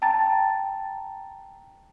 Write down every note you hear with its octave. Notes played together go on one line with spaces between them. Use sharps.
G5 A5 A#5 A6